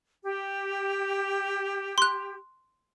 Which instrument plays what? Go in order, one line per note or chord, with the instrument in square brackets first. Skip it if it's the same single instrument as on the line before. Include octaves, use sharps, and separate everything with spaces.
[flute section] G4
[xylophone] C6 F#6